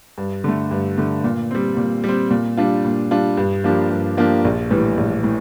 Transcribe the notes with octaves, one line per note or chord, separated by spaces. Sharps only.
G2
D3 A3
G2
D3 A3
A#2
G3 C4
A#2
G3 C4
A#2
G3 D4 F4
A#2
G3 D4 F4
G2
F3 A#3 D4 G4
G2
F3 A#3 D4 G4
A#1
A2 E3 G3
A#1
A2